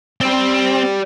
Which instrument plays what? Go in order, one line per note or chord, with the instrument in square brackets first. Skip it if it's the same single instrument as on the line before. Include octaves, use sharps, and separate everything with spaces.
[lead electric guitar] C4 [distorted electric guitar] G4 D5